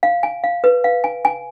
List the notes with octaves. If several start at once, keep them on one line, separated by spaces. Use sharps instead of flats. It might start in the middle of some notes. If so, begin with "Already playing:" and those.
F5
G#5
F5
B4
F5
G#5
G#5